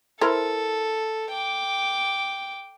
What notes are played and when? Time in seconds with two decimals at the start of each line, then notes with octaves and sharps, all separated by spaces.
0.21 E4 A4 A#4 C5
1.32 G5 D6